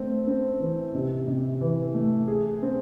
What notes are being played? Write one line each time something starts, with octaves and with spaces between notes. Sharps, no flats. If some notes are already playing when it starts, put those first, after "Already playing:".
Already playing: A3 C4
C4
E3
C3
C3
E3
A3
G#4
C4